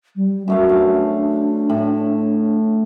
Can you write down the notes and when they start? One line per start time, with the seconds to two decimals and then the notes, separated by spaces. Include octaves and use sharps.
0.16 G3
0.48 F#2 A3 F#4 F5
0.69 D4 F5
1.70 A2